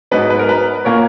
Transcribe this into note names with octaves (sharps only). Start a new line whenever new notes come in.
G#2 F#3 B3 B4 D#5
B4
A#4
B4
A#2 A#3 C#4 A#4 C#5